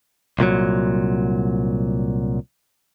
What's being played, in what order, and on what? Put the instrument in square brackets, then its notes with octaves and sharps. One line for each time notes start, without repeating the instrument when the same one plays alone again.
[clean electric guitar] C2 A#2 D3 F#3